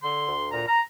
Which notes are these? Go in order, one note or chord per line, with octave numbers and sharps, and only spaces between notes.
D3 C6
D2
A#2 A#5
A#5